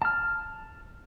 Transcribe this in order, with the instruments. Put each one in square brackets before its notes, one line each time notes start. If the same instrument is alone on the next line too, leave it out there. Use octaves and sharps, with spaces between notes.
[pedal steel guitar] A5 F6